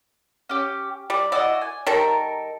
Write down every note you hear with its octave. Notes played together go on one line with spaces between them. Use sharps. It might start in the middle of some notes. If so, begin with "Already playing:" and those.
C#4 G4
G3 D5
E4 F#4 D5 D#5
G#5
D#3 G3 A4 A#4